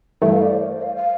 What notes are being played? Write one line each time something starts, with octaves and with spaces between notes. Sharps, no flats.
G2 E3 A3 E5
F5
D5
C5
A#4
C5
F5
F5